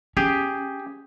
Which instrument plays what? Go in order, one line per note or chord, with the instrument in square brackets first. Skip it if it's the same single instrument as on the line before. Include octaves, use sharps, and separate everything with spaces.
[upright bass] C#4 [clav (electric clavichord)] G4 G#4